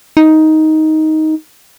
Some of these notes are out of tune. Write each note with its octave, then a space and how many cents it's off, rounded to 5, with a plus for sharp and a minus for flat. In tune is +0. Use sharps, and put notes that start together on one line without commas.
D#4 +10